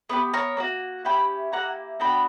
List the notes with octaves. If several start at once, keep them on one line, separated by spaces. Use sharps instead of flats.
B3 E4 G4 B4
A#4 C#5
A#3 D4 F#4
C#4 E4 G4 G5 B5
A#3 E4 G4 F#5 A#5
B3 D4 F#4 G5 B5